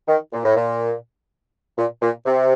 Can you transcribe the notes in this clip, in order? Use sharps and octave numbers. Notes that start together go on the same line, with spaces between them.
D#3
A#2
A2
A#2
A#2
A#2
C3